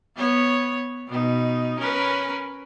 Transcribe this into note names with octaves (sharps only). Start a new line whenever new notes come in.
B3 C#5
B2 D#4
C#4 A#4 B4